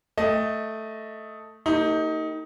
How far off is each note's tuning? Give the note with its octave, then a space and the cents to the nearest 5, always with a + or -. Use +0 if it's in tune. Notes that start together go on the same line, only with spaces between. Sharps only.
A3 +0 D#5 +10 G5 +30
A#3 -40 D#4 +20 G4 +0